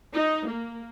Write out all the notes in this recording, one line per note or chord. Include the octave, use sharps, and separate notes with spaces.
D#4
A#3